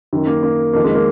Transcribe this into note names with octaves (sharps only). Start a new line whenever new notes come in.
F#2 D#3
A#3
A#3
F2 D#3 A#3
G#3
A#3